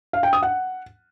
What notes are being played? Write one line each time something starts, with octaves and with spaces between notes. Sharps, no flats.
F5
G5
D#6
F#5